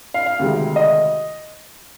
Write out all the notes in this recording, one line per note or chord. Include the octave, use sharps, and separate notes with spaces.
F5
F5
D2 C3 D#3 G#3
D#5